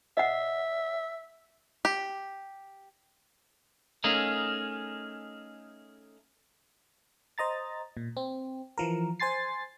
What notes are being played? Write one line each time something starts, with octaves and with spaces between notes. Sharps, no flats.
D#5 E5 F#5
G4
A3 C#4 D#4 G#4 A#4 F5
C5 D#5 A#5 A6
A#2
C4
E3 F3 A#4
C5 G#5 C6 A6 C7